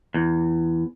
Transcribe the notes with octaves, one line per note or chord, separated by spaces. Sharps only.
E2